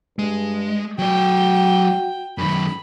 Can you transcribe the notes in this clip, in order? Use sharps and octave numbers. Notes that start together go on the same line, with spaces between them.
G2 G#3
F#3 F#4 D5 G5
F#2 D#3 B5